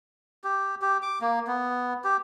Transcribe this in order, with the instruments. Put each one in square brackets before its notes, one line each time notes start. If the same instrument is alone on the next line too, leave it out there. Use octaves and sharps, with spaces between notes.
[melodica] G4
G4
D6
A#3
B3
G4